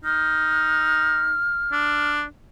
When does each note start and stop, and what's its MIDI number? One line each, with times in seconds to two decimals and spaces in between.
0.05 1.38 63
0.05 2.11 89
1.72 2.24 62